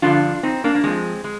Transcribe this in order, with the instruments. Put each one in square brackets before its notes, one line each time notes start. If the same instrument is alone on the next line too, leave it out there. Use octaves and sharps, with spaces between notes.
[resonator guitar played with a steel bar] G2 D3 F3 D4 F4
C4 D#4
A#3 D4
A#3
G2 F3 G#3 C4
G#3